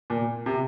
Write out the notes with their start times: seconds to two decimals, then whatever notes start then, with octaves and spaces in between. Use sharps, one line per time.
0.10 A#2
0.46 C3